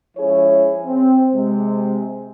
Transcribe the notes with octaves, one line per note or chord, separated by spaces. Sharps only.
F3 G#3 C#4 E4 G#4 C#5
C4
C3 G#3